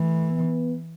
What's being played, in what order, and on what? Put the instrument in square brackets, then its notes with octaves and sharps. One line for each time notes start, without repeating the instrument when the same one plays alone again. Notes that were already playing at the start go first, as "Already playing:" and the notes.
Already playing: [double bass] E3 [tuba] A3
[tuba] B3